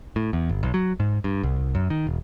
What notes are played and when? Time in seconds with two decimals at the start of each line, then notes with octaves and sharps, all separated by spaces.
0.16 A2
0.33 E2
0.49 G1
0.63 B1
0.74 F#3
1.00 G#2
1.24 G2
1.43 C2
1.75 F#2
1.90 D#3
2.07 E1